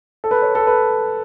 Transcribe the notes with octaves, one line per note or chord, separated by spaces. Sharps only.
A4
B4
C#5
A4
B4